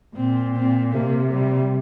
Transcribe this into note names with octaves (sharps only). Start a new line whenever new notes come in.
A#2 C4
C4
C3 A#3
G3